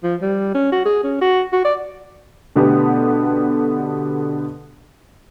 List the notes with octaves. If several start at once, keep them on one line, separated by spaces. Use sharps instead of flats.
F3
G3
C#4
F#4
G#4
C#4
F#4
F#4
D5
B2 D3 A3 B3 G4